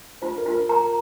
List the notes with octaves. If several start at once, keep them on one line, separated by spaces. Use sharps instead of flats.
F4 C5
A#4
F4
A#4
A#4 A#5